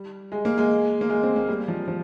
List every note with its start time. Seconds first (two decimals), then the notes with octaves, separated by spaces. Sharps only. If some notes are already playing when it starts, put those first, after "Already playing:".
Already playing: G3
0.32 G#3
0.45 A#3
0.58 G#3
1.01 A#3
1.10 G#3
1.23 C4
1.36 A#3
1.48 G3
1.68 F3
1.88 F3